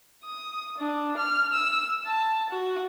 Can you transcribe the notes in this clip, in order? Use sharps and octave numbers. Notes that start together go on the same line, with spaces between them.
D#6
D4
F6
E6
A5
F#4